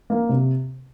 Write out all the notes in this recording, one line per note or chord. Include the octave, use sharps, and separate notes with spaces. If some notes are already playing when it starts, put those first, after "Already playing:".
A#3
C3